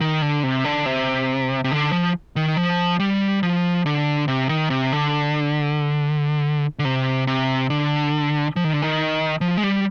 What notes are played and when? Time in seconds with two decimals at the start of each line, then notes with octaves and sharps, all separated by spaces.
0.01 D#3
0.22 D3
0.43 C3
0.64 D3
0.86 C3
1.64 C3
1.72 D3
1.92 F3
2.36 D#3
2.57 F3
3.00 G3
3.43 F3
3.86 D3
4.28 C3
4.49 D#3
4.70 C3
4.92 D3
6.79 D3
6.85 C3
7.27 C3
7.70 D3
8.56 F3
8.64 D#3
8.73 D3
8.82 D#3
9.41 F3
9.57 G#3
9.63 G3